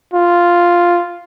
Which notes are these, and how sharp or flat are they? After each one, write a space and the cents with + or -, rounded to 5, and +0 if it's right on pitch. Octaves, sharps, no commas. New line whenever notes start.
F4 +0